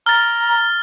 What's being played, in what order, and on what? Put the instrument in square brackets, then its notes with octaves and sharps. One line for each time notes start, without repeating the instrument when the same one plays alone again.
[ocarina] A#5 [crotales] F6 A6